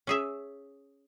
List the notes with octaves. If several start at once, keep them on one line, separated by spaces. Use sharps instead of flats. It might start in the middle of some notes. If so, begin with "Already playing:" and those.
C#4 G#4 E5